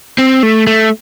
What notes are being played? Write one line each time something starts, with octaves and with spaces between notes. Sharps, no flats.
C4
A3
A3